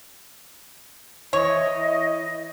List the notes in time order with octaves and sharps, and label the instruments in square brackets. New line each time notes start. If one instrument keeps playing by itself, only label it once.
[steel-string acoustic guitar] E3 E4 [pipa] C#5 [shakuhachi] D#5